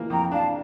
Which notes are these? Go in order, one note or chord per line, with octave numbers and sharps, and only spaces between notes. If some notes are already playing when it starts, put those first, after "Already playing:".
Already playing: E3 A#3
F2 G5 A#5
D4 F5 A5